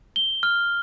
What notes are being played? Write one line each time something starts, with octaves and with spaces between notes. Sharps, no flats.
G7
F6